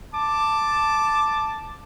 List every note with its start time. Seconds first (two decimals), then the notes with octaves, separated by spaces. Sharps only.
0.14 A5 D6